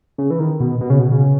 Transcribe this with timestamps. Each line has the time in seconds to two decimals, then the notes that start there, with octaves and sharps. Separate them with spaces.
0.18 C#3
0.30 E3
0.39 D#3
0.60 B2
0.81 B2
0.90 C#3
0.99 B2
1.12 C#3